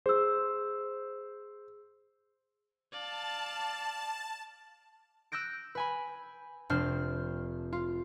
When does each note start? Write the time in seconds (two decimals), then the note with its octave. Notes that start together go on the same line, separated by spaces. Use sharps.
0.06 G#4 C5 E6
2.92 D5 F5 A5
5.32 E6 F#6 G6 A#6 D7
5.75 B4 G#5 B5
6.70 F1 C4 D4 C5 F6
7.73 F4